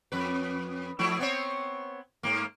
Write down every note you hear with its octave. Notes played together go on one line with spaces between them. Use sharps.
F2 B4
F3 A3 E4
B3 C4 C#5
G#2 A#3